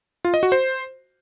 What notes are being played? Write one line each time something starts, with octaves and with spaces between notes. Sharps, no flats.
F4
D#5
F#4
C5